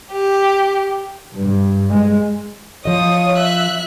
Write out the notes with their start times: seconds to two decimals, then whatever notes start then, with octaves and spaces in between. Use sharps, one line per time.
0.10 G4
1.36 G2
1.89 G#3
2.85 F3 C#5 D#5 D#6
3.38 E5 F#6